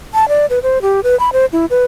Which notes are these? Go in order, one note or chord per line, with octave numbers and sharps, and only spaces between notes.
A5
D5
B4
C5
G4
B4
B5
C5
E4
B4